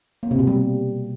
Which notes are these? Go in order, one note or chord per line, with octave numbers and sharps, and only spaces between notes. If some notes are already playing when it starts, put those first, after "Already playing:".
A#3
C3
B2
G3